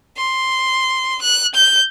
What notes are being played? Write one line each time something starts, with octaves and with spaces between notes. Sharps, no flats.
C6
F#6
G6